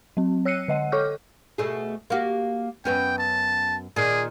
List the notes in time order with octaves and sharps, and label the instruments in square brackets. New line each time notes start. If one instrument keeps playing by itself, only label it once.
[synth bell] F#3 C4
C#5 E6 F#6 C7 C#7 D#7
D3 D#5 F#5
A4 C#5 C#6 D6 F6 G6
[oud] B2 A3 G#4
A#3 F#4 G4
[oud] F#2 B3 C#4 [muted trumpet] G5
[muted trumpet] A5
[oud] A#2 D#3 [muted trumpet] G#4